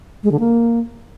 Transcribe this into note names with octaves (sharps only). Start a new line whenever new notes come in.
G#3
D3
A#3